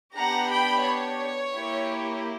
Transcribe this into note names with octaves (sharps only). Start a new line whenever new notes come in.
B3 D4 G4 F#5 A#5
G5 B5
C#5
A#3 E4 G4